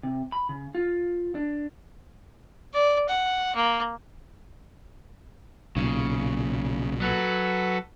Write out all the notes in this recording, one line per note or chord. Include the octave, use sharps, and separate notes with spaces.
C3
B5
C#3
F4
D4
D5
F#5
A#3
B1 A#2 C#3
F#3 F#4 A4 B4